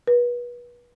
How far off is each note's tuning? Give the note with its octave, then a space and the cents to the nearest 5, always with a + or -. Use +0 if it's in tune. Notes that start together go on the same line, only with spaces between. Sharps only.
B4 -30